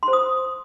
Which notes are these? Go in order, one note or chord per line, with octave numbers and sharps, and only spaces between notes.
C6
C5
D#6